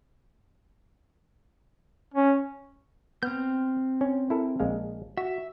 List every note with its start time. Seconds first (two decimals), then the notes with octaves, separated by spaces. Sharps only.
2.14 C#4
3.23 B3 C4 F6 G6
4.01 C#4
4.30 E4 A4 A#4
4.60 A#1 G#3 F5
5.17 F#4 E5